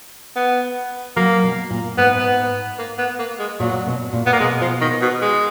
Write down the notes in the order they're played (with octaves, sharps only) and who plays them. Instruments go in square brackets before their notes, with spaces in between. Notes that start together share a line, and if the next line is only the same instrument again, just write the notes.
[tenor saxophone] B3
[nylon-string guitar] F#3 [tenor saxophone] A#3
[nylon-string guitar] B2
A#2
[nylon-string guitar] G#2 [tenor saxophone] B3
[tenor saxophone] B3
A#3
B3
A#3
G#3
[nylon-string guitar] A#2 [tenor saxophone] F#3
[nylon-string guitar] B2
A#2
[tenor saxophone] B3
A#3
[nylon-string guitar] B2 [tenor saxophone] G#3
[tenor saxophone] F3
D#3
B2
G#3